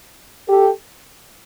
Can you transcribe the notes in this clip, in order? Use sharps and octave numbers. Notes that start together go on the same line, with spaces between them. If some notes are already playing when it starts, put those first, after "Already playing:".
G4 A4